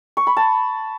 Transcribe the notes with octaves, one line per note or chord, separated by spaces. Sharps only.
C#6
B5
A5